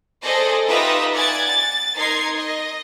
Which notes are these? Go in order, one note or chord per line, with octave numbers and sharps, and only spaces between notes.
G#4 A4 C5 D5 D#5
D#4 F4 G4 B4 E5 D#6
D5 F#5 G#5 G#6 A6
A6
D#4 A#4 C6 G#6 C7
D#5